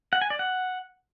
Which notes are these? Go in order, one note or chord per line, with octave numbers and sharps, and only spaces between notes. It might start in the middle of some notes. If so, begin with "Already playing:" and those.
F#5
G#5
D5
F#5